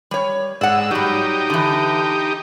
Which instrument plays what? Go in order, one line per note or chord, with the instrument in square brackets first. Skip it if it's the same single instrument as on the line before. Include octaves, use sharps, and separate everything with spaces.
[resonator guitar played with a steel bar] G3 C#5
[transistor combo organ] G#2 E6 [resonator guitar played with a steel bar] D5 F#5
[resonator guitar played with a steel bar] F#3 G3 [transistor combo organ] D#4 G4
[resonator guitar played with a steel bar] D3 E3